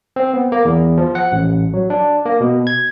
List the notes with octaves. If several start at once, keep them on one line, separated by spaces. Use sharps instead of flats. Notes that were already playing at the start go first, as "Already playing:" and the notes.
C4
B3
A#3
E2
F3
F#5
A1
F#3
D4
A#3
B2
G#6